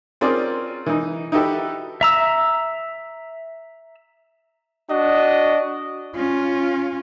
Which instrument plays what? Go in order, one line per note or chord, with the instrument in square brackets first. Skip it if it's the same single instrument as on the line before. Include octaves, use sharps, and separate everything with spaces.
[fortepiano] C4 C#4 F4 G#4 A#4 D5
E3 D#4
D#4 E4 F#4 G4 A4 B4
[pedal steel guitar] E5 A#5 E6
[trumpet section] D4 F#4 D#5
[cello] C#4 F4